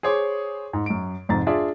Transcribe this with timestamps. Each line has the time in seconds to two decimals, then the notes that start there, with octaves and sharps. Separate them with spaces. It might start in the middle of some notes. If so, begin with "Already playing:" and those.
0.03 G#4 C5 C#5 C6 D6
0.73 G#2
0.86 F#2 D7
1.29 F1 F2 G#2 A#5 A6
1.47 D4 F4 G#4 D5 E5